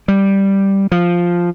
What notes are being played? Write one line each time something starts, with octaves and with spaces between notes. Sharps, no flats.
G3
F3